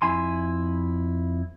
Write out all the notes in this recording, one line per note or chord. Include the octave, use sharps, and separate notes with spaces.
F2 E4 G#5 C6